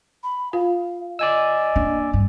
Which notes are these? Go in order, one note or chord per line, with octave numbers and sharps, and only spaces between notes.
B5
F4 F5
D5 D#5 G#5 E6
A#3 D4
G2